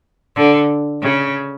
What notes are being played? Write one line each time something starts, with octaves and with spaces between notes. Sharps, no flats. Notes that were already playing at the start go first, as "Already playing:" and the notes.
D3
C#3